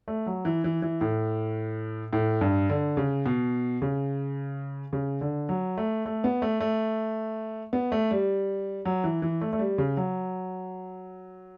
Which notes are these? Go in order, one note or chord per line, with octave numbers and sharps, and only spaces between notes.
A3
F#3
E3
E3
E3
A2
A2
G2
D3
C#3
B2
C#3
C#3
D3
F#3
A3
A3
B3
A3
A3
B3
A3
G3
F#3
E3
E3
A3
A3
G3
C#3
F#3